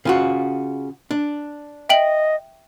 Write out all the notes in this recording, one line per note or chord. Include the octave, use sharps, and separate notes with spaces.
C#3 F4 F#4
D4
D#5 E5 G5 F#7